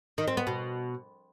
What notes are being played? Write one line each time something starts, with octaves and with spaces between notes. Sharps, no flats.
D#3
C4
B3
B2